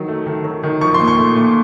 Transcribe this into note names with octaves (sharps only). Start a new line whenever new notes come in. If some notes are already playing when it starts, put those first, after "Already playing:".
Already playing: D#3 F#3
A3
D#3
F#3
D#3
F3 C#6
C6
A#2
C#6
A3
A#2